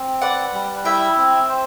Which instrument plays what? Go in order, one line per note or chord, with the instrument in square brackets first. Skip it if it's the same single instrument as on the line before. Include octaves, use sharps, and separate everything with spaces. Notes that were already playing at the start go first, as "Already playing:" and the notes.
Already playing: [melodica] C4
[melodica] B4 [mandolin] D5 F#5
[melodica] G3
[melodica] E4 [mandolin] E5 G5
[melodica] C4
C5